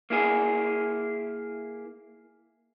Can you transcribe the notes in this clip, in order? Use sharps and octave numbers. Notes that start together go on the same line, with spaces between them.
A#3 E4 G#4